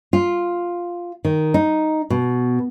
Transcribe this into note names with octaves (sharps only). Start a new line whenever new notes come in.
F4
D#3
D#4
B2